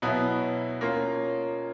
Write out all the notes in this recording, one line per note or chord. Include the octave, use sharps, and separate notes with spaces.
B2 F#3 B3 E4
A#3 C#4 F4